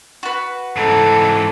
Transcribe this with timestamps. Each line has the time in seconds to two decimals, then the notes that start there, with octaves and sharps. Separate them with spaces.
0.23 F#4 B4
0.76 G#2 E3 A4